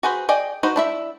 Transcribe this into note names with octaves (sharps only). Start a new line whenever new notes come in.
F#4 G#4 B4 C5
G#4 D5 D#5 G5
D#4 F#4 B4 C5
D4 E4 E5